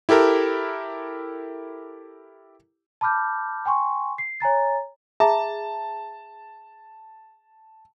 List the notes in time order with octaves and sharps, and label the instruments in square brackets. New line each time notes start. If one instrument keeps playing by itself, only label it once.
[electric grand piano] E4 G4 A4 A#4
[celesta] A5 B5 D6 F6 G6
G5 G#5 C6 C#6
C7
C#5 G#5 A#5 A6
[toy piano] G#4 E5 A#5 [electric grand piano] A5